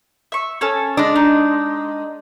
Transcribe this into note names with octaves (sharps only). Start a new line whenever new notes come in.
E5 C#6
C#4 A4 C#5
G#3 D4
D#4